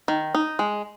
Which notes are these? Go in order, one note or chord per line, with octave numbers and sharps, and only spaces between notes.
D#3
D#4
G#3